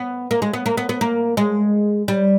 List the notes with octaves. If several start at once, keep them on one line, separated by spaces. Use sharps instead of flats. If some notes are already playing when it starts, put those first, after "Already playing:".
Already playing: B3
A#3
G#3
B3
A#3
B3
B3
A#3
G#3
G3